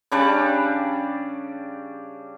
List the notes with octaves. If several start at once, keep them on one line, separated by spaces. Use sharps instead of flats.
C#3 G3 D4 D5